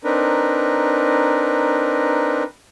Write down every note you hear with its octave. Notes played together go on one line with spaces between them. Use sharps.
C4 D4 D#4 A#4 B4